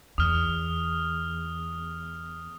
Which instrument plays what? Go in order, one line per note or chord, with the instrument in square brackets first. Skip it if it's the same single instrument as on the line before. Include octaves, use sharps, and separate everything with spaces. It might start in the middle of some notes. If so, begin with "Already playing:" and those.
[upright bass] E2 [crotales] D#6 F6